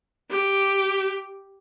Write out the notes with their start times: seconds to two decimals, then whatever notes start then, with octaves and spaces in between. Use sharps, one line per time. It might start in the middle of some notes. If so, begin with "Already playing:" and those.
0.30 G4